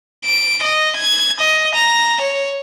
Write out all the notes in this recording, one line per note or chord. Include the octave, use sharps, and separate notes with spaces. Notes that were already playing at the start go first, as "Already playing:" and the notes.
D7
D#5
G#6
D#5
A#5
C#5